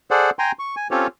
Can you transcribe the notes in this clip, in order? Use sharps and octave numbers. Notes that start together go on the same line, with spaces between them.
G#4 A4 C5 D5 F#5
G5 G#5 A#5 C6
C#6
G#5
C4 C#4 F4 G4 A4 C#5